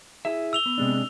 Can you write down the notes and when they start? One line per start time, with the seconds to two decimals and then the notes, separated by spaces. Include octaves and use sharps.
0.25 E4 G#4 E5
0.53 E6 F7 G7
0.66 B3
0.78 C3 G#3 D4